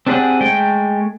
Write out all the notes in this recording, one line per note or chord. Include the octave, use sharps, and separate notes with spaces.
C4 D4 G4 G#4 F#5
G#3 A3 G5